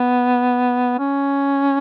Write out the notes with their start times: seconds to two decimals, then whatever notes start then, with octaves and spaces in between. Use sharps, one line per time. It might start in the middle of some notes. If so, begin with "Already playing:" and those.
Already playing: B3
0.99 C#4